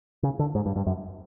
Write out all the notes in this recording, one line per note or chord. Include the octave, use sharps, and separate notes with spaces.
C#3
D3
G#2
G2
G2
F#2